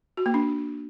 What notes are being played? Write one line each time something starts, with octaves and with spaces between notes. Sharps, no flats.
F#4
A#3
D4